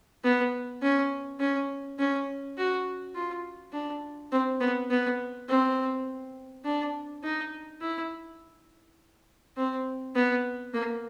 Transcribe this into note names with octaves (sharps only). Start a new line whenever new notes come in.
B3
C#4
C#4
C#4
F#4
F4
D4
C4
B3
B3
C4
D4
D#4
E4
C4
B3
A#3